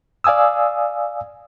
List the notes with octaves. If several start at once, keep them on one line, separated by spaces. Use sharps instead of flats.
D5 F5 G#5 D#6 E6